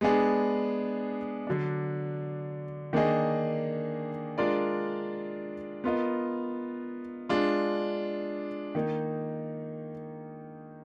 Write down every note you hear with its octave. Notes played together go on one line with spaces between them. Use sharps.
G#3 B3 D4 G#4
D3 F#3 D4
D#3 A#3 D4 G#4 D#5
G#3 D4 F4 A#4 D5
B3 F4 A#4 D#5
G#3 D4 F4
D#3 A#3 D#4